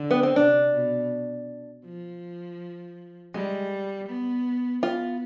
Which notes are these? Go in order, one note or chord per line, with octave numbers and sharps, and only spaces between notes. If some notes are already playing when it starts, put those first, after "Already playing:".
Already playing: D3
B3
C4
C3 D4
B2
F3
G3 G#3
B3
B3 F4